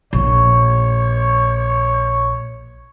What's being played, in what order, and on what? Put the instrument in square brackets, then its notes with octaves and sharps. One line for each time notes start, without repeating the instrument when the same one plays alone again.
[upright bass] A#1 [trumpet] C#5